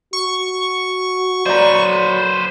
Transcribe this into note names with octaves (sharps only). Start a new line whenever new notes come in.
F#4 C#6
F#3 B4 C5 D5 A#5